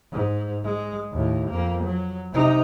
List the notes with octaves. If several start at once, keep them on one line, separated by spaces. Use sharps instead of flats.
G#2
G#3
D#2 A2
F2 A#3
F#3
C3 D#4